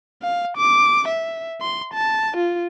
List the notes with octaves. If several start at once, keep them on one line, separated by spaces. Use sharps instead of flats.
F5
D6
E5
C6
A5
F4